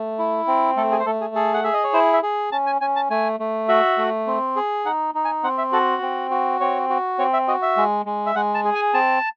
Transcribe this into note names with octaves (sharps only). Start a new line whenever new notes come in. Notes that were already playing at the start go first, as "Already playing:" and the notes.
Already playing: A3
E4
C4
A3 A4
G#4
C5
A3 A4
G#4
G#4 A4
F#5
G#4 E5
D#5
C#5
E4 C5
E5
G#4
C#4 A5
G#5
C#4 G#5
A5
A3 G#5
A3
F#4 E5
A3
C4
G#4
D#4 F#5
D#4
G#5
C4 F#5
E5
F#4 A4
C4
F#4
C4 C#5
F#4
C4 C#5
E5
F#4 D#5
E5
G#3
G#3
E5
G#3 F#5
A5
G#4
G#5
C4 A5